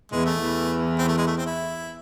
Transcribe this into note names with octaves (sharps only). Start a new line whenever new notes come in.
E2 E3 G#3
A3
E2 E3
C4
A3
G#3
A3
C4
E4